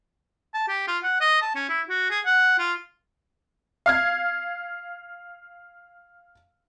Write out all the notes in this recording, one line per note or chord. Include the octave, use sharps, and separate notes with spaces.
A5
G4
F4
F#5
D#5
A5
C#4
E4
F#4
G#4
F#5
F4
F5 F6 G#6